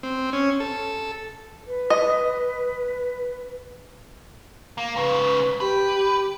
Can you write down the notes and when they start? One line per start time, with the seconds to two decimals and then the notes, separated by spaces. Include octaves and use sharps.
0.03 C4
0.33 C#4
0.60 A4
1.67 B4
1.90 D#5
4.78 A#3
4.96 G#2 C#3 B4
5.60 G4 B4